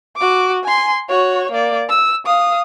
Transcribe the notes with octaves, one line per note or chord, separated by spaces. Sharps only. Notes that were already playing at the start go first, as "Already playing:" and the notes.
F#4 D6
G#5 C6
F#4 C#5
A#3 D5
E6
F5 D#6